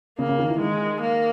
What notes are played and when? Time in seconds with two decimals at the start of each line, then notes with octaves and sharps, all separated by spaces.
0.19 C#3 A#3
0.29 C#3
0.39 D#3
0.50 E3
0.59 D#3 G#3
1.01 A#3